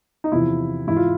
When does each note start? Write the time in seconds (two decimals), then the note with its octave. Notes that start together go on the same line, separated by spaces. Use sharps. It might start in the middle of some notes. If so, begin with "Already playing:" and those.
0.24 D#4
0.32 E2 C3 F3 E4
0.87 G#2 E3 E4
0.97 F4